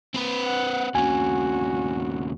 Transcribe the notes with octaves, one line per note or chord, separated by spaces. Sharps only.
C4 B4
F#5
D#2 C#3 F#4 G#5